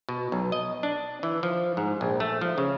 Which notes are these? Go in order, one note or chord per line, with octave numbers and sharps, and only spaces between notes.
B2
B1
D#5
D4
E3
F3
G#2
A#1
A3
F3
C#3